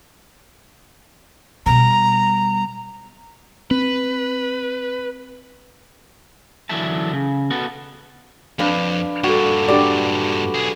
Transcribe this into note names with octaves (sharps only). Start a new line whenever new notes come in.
B2 G3 A#5
C4 B4
D3 E3 F#3 D4 E5 A5
C#3
B3 F#4 A4
F2 D4 B4 F5
G2 A#2 F#4 A4
D4 G4 D5 B5 D6
B1 G#4